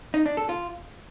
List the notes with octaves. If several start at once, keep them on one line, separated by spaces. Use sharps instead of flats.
D#4
D4
A4
F4